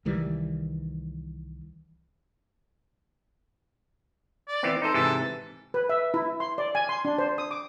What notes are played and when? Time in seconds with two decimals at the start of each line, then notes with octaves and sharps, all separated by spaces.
0.05 C2 D#3 E3 G3
4.48 D5
4.63 E3 B3 C4
4.82 D#4 A4 C5
4.94 G#2 C3 E3 A4
5.74 B4
5.89 E5
6.14 E4
6.40 C6
6.58 D5
6.75 G#5
6.89 C6
7.05 D4
7.18 C5
7.38 D#6
7.51 D6